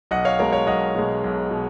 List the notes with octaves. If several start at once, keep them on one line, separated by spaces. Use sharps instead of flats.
B1 D#5 F#5
C#5 F5
B2 G#3 A#4 C#5
C#5 F5
B1 D#5 F#5
B2 G#3
B1
B2